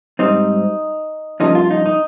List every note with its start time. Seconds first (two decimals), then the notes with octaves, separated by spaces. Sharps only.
0.19 G#2 G3 C4 D#4
1.40 G2 F3 A#3 C#4 D#4
1.55 F4
1.70 D#4
1.86 D#4